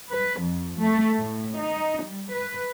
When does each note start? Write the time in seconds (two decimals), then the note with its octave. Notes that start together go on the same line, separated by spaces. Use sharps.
0.11 B4
0.41 F2
0.79 A3
1.19 A2
1.57 D#4
2.04 G3
2.33 B4